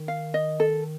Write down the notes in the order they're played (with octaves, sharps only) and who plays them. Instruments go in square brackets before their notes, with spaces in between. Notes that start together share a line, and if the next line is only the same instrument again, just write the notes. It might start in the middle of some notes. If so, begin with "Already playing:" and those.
Already playing: [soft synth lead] D#3
[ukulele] F5
D#5
A4